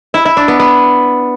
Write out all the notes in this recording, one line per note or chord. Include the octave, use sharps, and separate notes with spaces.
E4
E4
D4
B3
B3